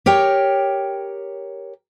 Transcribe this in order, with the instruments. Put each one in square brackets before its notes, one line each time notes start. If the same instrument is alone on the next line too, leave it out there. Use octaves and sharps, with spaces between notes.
[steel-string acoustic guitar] G4 A#4 C#5 G5